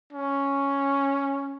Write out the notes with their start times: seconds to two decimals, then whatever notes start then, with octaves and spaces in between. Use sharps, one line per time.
0.13 C#4